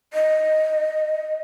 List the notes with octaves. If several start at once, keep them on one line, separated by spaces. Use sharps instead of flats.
D#5